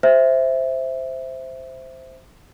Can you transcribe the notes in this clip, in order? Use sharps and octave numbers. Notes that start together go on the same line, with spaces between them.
C5 E5